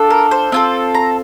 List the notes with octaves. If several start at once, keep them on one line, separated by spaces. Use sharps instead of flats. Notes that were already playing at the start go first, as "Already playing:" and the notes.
Already playing: D4 F4 A4
A#4
C5
C4 F4 A4
A#5